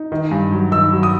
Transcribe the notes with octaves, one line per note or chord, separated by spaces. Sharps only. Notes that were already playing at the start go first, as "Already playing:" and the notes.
Already playing: D#4
D#3
G2
F#3
D#3 E6
F#3
D#6